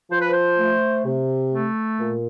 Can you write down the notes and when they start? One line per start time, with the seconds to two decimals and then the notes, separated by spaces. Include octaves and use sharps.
0.10 F3 C5
0.21 B4
0.31 C5
0.58 A3
1.05 C3
1.53 A3
2.00 A#2